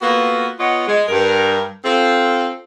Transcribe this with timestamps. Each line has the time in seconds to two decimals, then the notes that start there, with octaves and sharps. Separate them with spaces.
0.02 A#3 B3 F4 F#4 A4 B4
0.59 B3 F4 C#5 D#5 F#5
0.87 G#3
1.08 G2 A#4
1.85 C4 F4 A4